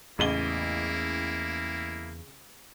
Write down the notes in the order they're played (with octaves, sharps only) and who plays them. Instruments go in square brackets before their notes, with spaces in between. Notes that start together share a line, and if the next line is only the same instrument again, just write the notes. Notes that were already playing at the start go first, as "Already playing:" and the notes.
[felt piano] A1 [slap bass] E2 [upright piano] C#3 D#7 G7 [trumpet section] A#3 E4